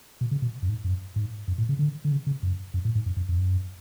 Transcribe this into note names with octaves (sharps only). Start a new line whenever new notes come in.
B2
C#3
B2
F#2
G#2
F#2
G#2
F#2
A2
C#3
D3
D3
C#3
C#3
F#2
F#2
A2
G#2
F#2
F#2
F2
F#2